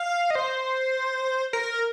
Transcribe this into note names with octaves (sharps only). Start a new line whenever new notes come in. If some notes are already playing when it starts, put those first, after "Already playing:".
Already playing: F5
D#5
C5
A#4